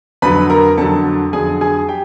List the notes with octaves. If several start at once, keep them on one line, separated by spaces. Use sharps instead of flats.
F2 D3 F#3 B4 B5
A#4 A#5
F2 D3 F#3 A4 A5
F2 D3 F#3 G#4 G#5
G#4 G#5
G4 G5